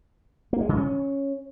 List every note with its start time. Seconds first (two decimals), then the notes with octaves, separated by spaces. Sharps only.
0.53 A#3
0.61 G#3
0.69 C#3
0.77 C#4